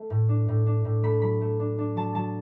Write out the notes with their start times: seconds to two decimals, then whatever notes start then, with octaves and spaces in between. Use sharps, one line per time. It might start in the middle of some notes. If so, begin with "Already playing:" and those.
Already playing: A3
0.10 A2
0.29 D4
0.48 A2
0.66 D4
0.85 A2
1.03 A3 B5
1.22 F#3 B5
1.41 A3
1.59 D4
1.78 D4
1.96 F#3 A5
2.15 F#3 A5